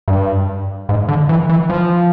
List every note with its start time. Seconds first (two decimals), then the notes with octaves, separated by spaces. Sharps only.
0.08 G2
0.89 G#2
1.08 D3
1.29 E3
1.49 E3
1.70 F3